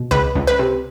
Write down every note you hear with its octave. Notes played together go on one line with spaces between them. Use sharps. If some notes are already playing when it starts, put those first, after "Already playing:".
Already playing: B2
C#2 B4
C#2
B4
C3